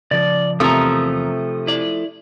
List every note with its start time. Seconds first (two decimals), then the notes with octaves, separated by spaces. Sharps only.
0.11 C#3 F3 D5
0.60 E2 C3 F3 A3 A#4 D#6
1.67 E4 D5